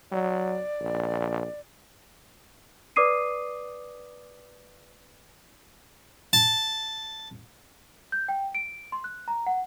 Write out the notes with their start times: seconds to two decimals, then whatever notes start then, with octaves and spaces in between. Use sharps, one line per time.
0.12 F#3 D5
0.81 A#1
2.96 B4 D5 D6 D#6 C7 D#7
6.33 A5
8.12 G6
8.28 G5
8.55 D7
8.92 C6
9.04 F#6
9.28 A#5
9.47 F#5